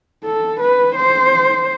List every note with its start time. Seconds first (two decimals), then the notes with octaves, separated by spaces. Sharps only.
0.25 A4
0.60 B4
0.96 C5